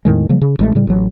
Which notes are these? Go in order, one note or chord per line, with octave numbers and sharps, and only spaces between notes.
E2 A2 D#3 G#3
C#3 F3 G3 A#3
C#3
A1 G#3 A3
A2 C#3 G3
A1 F#3